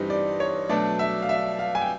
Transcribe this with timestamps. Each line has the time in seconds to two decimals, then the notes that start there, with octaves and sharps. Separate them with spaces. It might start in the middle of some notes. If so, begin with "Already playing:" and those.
Already playing: G2 E3 G3 C4 D#4 D#5
0.10 D5
0.40 C#5
0.69 B2 F#3 A3 D4 D5
0.99 E5
1.22 F5
1.29 E5
1.59 F5
1.75 G#5
1.81 G5